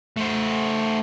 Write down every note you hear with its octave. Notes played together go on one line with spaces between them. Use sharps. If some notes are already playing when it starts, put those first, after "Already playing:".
A3 C5